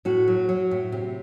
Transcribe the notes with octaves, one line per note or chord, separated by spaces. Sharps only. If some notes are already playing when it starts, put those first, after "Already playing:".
A2 F#4
F#3
F#3
A2
C3